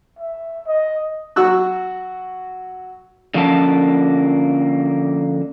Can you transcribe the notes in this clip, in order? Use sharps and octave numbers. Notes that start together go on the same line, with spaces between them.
E5
D#5
F#3 F#4 C#6 E6 F#6
D3 F3 A#3 C#4 A5